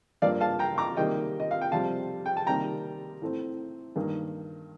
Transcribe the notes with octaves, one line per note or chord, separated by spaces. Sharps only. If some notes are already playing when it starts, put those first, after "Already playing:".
G2 F3 A#3 D5 F5
F5 A5
G5 A#5
A#5 D6
C3 D#3 G3 A#3 D#5 G5
D#5
F5
G5
F2 C3 G3 C4 F5 A5
G5
A5
C3 D#3 G3 A#3 G5 A#5
A2 A3 C4
G2 D#3 A#3